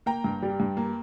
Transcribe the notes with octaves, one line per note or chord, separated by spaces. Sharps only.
A#3 G5 A#5
G2
G3
G2
A#3